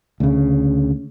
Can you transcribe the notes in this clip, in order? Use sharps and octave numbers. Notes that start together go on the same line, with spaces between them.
D2 C#3